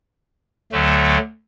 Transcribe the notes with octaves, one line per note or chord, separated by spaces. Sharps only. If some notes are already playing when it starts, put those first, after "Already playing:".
D2 D3 F#3 A3